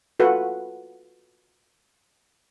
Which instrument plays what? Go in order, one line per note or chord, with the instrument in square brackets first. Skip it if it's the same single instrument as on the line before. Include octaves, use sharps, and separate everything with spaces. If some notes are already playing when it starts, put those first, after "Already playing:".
[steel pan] F4 F#4 A4 B4 F#5